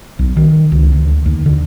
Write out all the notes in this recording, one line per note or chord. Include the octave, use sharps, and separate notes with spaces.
B1
D#3
C#2
D2
D#2
D3